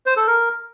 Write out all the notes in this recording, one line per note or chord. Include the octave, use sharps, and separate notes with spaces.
C5
A4
A#4